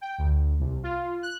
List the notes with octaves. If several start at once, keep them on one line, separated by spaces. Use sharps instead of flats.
G5
D2
C2
F4
F#6